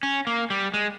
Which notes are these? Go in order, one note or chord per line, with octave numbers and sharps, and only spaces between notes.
C#4
A#3
G3
G#3